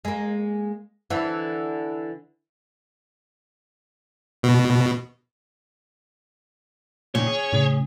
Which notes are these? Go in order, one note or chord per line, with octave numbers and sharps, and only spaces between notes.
G#3 A#3
D3 E3
B2
A#2 D#3 C#4 C#5
G#4
A2 C#3